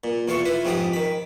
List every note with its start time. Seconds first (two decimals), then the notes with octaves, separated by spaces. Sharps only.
0.04 A#2
0.28 E2 F4 A4 F5 C#6
0.45 E4 F4 B4
0.65 F2 G#2 G#3 G4 F5 D#6
0.93 D#3 B5